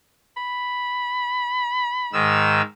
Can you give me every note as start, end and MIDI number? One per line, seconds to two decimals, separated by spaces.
0.37 2.16 83
2.13 2.62 44
2.13 2.62 51
2.13 2.62 88